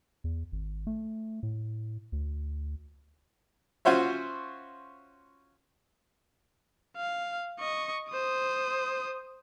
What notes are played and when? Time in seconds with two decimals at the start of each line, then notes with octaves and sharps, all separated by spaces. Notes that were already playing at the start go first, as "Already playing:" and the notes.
0.24 E2
0.52 G#1
0.87 A3
1.43 A2
2.12 D2
3.85 C#4 F4 F#4 C5 C#5 E5
6.96 F5
7.59 D#5 C#6
8.10 C5 D#6